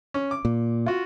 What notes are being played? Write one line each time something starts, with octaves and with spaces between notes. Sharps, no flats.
C#4
D6
A#2
F4 F#4